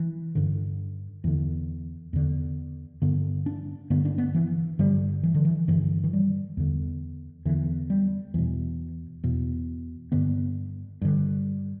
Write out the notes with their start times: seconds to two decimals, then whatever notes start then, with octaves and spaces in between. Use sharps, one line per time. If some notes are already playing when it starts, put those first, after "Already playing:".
Already playing: E3
0.35 G2 D3
1.24 E2 D3 E3
2.13 E2 D3
3.02 G2 D3 B3
3.46 D4
3.90 G2 D3 B3
4.05 D4
4.18 B3
4.35 E3
4.79 G2 D3 G3
5.23 E3
5.34 D3
5.45 E3
5.68 G2 D3 E3
6.04 E3
6.13 G3
6.57 E2 D3
7.45 E2 D3 E3
7.90 G3
8.34 E2 B2 E3
9.24 E2 B2
10.12 G2 D3 B3
11.02 G2 D3